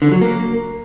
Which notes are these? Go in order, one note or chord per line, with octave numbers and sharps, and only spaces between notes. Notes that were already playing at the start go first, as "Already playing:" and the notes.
D3
F#3
A#3